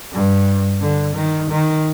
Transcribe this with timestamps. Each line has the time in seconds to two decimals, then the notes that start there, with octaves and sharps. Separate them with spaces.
0.12 G2
0.81 D3
1.15 D#3
1.51 D#3